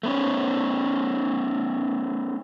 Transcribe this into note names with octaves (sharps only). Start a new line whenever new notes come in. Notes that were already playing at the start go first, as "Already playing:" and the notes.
A3 B3 C#4